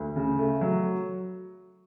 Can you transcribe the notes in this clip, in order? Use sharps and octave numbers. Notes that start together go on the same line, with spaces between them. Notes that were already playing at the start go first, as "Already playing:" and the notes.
Already playing: D2
C#3
A3
F#3